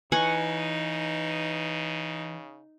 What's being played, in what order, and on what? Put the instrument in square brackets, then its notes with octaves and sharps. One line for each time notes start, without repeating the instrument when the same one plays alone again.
[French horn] C#3 [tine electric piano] E3 B4 [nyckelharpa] D#4 [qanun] F#5 G#5 C#6